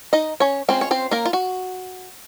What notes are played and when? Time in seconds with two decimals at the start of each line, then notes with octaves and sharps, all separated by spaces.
0.13 D#4 D#5
0.40 C#4 C#5
0.69 G#3 C4 C#4 F4 C5
0.81 C#5
0.91 C4 C5
1.11 A#3 A#4
1.26 F4
1.33 F#4